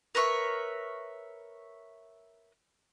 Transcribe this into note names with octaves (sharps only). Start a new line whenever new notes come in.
A#4 B4 C#5 E5